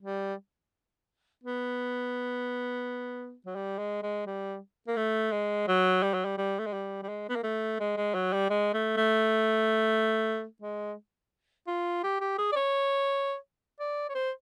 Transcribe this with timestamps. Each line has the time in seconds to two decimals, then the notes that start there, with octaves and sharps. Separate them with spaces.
0.02 G3
1.44 B3
3.46 F#3
3.55 G3
3.79 G#3
4.03 G#3
4.26 G3
4.87 A#3
4.97 A3
5.31 G#3
5.68 F#3
6.03 G3
6.14 F#3
6.25 G3
6.38 G3
6.59 A3
6.66 G#3
6.73 G3
7.03 G3
7.08 G#3
7.29 B3
7.36 A#3
7.44 A3
7.80 G#3
7.97 G#3
8.14 F#3
8.33 G3
8.50 G#3
8.74 A3
8.97 A3
10.62 G#3
11.67 F4
12.03 G4
12.21 G4
12.38 G#4
12.52 D5
12.56 C#5
13.80 D5
14.09 C#5
14.15 C5